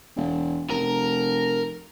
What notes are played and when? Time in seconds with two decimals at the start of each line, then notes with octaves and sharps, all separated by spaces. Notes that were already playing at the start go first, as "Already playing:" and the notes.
0.16 E1
0.70 F1 A#4